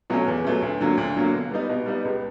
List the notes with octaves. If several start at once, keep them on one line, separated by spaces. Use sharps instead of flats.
B2 F#3 A3 C#4
E2
B2 F#3 A3 C#4
D2
D3 F#3 A#3
D2
D3 F#3 A#3
B2
G3 B3 D#4
B2
G3 B3 D#4
C#2